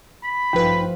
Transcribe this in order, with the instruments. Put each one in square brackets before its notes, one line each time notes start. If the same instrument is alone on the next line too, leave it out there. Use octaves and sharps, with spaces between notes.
[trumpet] B5
[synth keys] A1 B4 [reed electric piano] G2 D#4 G5 [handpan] F3 F4